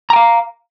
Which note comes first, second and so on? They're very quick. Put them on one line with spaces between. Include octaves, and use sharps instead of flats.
A#5 G5 F5